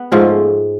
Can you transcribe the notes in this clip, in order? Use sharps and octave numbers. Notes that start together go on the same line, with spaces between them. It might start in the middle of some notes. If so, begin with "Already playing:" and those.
Already playing: B3
G#2 F3 A3 C#4